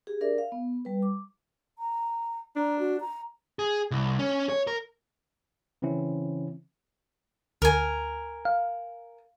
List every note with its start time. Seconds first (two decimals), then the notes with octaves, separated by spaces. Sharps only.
0.07 G4 G#4
0.21 D4 A#4 D5 E5
0.38 F5
0.52 B3
0.85 G3 B4
1.02 D6
1.79 A#5
2.56 D4 A#5
2.79 F#4
3.01 A#5
3.59 G#4
3.91 C2
4.19 C#4
4.49 C#5
4.67 A#4
5.82 C#3 E3 C4 C#4 E4
7.62 D2 A#4 G#5
8.45 F5